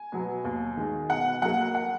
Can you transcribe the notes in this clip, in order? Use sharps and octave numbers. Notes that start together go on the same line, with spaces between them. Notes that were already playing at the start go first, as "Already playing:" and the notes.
Already playing: G#5
B2 F#3 B3
D#2
D#3 G#3
B2 F#5
F#3 A#3 F#5
F#5